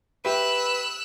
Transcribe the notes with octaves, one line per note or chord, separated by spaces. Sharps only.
G4 B4 E5 E6 F#6